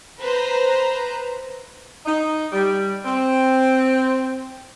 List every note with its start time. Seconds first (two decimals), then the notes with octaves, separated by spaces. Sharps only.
0.21 B4 C5 A#5
2.06 D#4
2.53 G3
3.05 C4